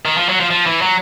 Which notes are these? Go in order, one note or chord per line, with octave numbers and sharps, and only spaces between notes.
D#3
F3
F#3
F3
F3
E3
F#3